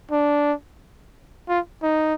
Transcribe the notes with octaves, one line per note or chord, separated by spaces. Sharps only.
D4
F4
D#4